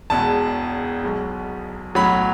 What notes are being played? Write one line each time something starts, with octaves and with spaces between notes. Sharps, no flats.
E1 E2 B2 G#3 A5
B1 B2 G#3
B1 A2 F#3 B5